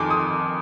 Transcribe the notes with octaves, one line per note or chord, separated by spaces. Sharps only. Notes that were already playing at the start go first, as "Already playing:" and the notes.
Already playing: F2 D#3 G#5 C6 D6
D#6